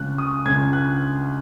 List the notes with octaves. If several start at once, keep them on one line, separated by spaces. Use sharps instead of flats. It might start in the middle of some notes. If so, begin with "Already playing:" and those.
Already playing: C#2 C#3 F#6
D#6
C#2 C#3 G#6
F#6